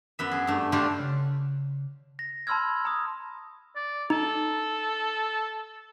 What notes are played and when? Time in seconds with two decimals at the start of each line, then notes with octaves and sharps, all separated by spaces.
0.19 F#2 B3 E5
0.32 G#4
0.47 G2 A3
0.72 D3 G3 A3 F4 G4
0.99 C#3
2.19 A#6
2.47 A5 B5 C6 E6 F6 G#6
2.85 A#5 D#6
3.76 D5
4.10 D#4 A4